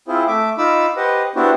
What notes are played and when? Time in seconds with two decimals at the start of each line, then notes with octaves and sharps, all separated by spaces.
0.08 C4 E4 F4 G#4 C5
0.28 A3 E5 D6
0.58 D#4 F4 B5 D6 E6
0.96 G4 B4 C5 D#5 F#5
1.36 B3 D4 E4 F#4 G4 C5